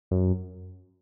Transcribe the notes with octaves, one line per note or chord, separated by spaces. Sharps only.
F#2